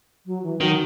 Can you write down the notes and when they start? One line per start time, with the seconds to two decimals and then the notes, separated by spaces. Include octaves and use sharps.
0.26 F#3
0.43 E3
0.60 D#3 F#3